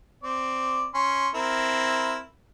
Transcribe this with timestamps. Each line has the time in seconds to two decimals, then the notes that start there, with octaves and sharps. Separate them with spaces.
0.23 C4 D5
0.94 C#4 C6
1.34 C4 E4 A#4